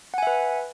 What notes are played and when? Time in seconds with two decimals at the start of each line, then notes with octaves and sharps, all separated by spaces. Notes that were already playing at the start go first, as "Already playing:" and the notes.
0.14 F#5
0.18 G#5
0.23 E5
0.27 B4